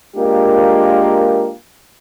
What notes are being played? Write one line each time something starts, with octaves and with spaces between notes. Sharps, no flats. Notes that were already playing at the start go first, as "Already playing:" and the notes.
G#3 A#3 D4 F4 G4 A#4